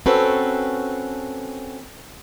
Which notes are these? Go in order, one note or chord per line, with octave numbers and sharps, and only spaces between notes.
C4 C#4 F#4 A4 B4